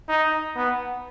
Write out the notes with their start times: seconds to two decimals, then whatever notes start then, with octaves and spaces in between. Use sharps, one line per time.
0.08 D#4
0.55 B3